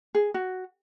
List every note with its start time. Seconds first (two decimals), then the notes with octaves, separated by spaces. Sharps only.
0.15 G#4
0.34 F#4